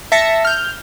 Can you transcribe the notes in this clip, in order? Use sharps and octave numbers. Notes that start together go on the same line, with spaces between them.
E5 A5 A#6 C#7
F6 G6